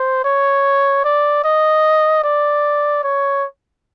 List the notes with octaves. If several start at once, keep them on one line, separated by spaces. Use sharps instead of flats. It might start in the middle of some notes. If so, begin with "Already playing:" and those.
Already playing: C5
C#5
D5
D#5
D5
C#5